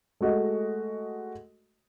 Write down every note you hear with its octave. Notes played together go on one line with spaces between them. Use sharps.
G#3 A3 F#4 D#5